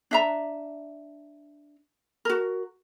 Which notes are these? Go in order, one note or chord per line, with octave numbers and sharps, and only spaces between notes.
D4 E5 A#5
F#4 A#4